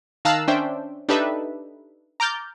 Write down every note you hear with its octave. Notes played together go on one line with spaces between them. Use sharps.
D#3 F5 A5 A#5 E6 F#6
C#4 D4 C5 E5 G5
D4 D#4 G4 A4 B4 E5
A#5 D6 F6 G6 A6